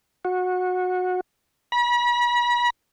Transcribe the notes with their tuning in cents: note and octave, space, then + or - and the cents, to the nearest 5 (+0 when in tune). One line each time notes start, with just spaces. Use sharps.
F#4 -20
B5 -40